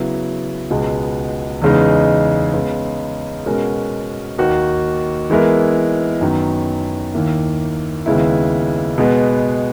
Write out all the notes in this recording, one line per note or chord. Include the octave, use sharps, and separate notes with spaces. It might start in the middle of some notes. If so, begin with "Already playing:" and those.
Already playing: C#3 F#3 B3 E4
C#2 B2 G#3 B3
E2 C#3 G#3 B3 D#4
C#3 G#3 B3
B2 G#3 C#4 F#4 A#4
D#2 D#3 A#3 D#4 F#4
E3 G#3 B3 E4 A#4
F#2 D#3 F#3 B3
D#2 D#3 A#3 E4
D#2 C#3 G#3 B3 E4
B2 G#3 B3